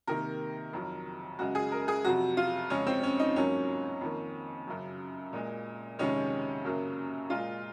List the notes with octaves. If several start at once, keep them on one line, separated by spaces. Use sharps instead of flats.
C3 D#3 A#3 A#4
F2 D#3 F#3
F#2 C#3 G#3 F#4
G#4
A#4
G#4
F2 C3 F#3 F#4
F4
F2 C#3 G#3 C#4
C4
C#4
D#4
G#2 F#3 A#3 C#4
F2 D#3 A#3
F#2 C#3 F#3
A#2 G#3
F2 C3 D#3 G#3 C#4
F#2 C#3 F#3 A#3
A#2 G#3 F4